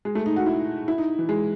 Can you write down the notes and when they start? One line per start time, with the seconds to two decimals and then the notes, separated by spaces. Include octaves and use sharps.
0.05 G#3
0.15 A3
0.26 D#4
0.36 F#4
0.46 E4
0.88 E4
0.98 D#4
1.19 E3
1.29 G#3